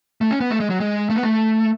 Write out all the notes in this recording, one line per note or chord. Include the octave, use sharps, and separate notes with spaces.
A3
C#4
B3
A3
G#3
F#3
G#3
A3
B3
A3